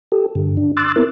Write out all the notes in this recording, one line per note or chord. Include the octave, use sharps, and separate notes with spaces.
G4 A4
G2 D3
D4
C6 D6 E6 F#6 A6
B3 C4 E4 A#4